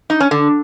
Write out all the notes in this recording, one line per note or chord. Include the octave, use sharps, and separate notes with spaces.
D#4
C#4
D3